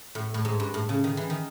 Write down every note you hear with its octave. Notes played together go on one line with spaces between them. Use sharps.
A2
A2
G#2
G2
A2
C#3
D#3
E3
D#3